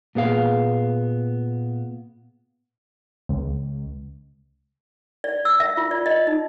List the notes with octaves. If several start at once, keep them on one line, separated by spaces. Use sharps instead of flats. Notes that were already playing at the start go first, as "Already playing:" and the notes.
A#2 B3 G#4 F5
C#2
D5
E6
E5
F4
D5
D#5
D#4